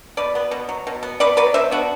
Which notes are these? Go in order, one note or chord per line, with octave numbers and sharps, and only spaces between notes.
B2 B4 D5
B3
B2
F#3
B2
B3
B2 B4 D5
F#3 B4 D5
B2 C5 E5
B3 D4 F#4